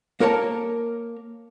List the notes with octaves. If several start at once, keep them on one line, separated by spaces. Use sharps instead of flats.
A#3 A#4 C#5 A5